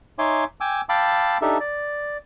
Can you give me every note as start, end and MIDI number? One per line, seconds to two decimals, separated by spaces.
0.19 0.44 63
0.19 0.44 73
0.19 0.44 76
0.19 0.44 80
0.19 0.44 84
0.19 0.44 86
0.61 0.81 79
0.61 0.81 80
0.61 0.81 86
0.61 0.81 88
0.89 1.38 77
0.89 1.38 79
0.89 1.38 81
0.89 1.38 83
0.89 1.38 86
0.89 1.38 88
1.42 1.58 62
1.42 1.58 63
1.42 1.58 67
1.42 1.58 69
1.42 1.58 76
1.60 2.17 74